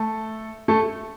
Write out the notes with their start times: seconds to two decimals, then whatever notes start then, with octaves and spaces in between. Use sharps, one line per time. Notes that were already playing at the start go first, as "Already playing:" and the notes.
Already playing: A3 A4
0.68 A3 A4